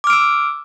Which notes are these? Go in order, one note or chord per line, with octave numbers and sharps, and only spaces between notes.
D6 E6 F6 D7